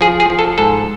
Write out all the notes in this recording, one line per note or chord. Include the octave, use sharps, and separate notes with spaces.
F3 G#4
G#4
F3
A4
G#2 A4